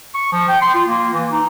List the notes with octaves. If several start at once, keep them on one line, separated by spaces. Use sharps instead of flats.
C#6
F3
G5
C6
F4
A#3
E3
D#4